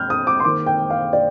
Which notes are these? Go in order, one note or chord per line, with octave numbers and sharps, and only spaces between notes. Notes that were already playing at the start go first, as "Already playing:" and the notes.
Already playing: F6 G6
D#6
D6
C6
D#3 A#3 D6
G5
F5
D5